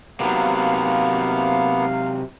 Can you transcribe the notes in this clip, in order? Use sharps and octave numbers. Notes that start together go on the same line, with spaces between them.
C3 F#3 A#3 B3 F5